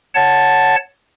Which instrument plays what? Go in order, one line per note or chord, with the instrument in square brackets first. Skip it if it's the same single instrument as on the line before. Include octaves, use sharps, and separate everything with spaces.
[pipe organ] C#5 F#5 A5 A6